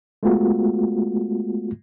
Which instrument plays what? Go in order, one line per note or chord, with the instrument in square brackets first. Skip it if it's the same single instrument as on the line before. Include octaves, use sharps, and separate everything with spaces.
[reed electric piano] G#3 A3 B3 F4 F#4